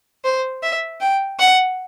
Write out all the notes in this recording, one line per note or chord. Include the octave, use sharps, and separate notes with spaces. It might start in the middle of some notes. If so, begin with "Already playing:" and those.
C5
E5
G5
F#5